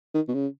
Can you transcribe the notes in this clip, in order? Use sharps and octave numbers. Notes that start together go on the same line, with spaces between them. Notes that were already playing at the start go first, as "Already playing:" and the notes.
D#3
B2
C#3